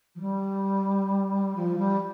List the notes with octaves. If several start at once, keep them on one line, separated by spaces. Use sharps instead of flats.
F3
G3
F3
G3